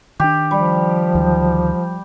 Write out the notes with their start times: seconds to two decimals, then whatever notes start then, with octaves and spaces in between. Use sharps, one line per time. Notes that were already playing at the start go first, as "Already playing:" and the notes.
0.20 D#3 D4 G4
0.51 F3 G3
1.15 D2 D#3 F#3